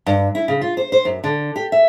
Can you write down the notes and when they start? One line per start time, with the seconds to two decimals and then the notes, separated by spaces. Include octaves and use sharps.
0.06 G2
0.35 E4
0.48 C#3
0.61 F4
0.77 C5
0.92 C5
1.05 F#2
1.24 D3
1.56 G4
1.72 E5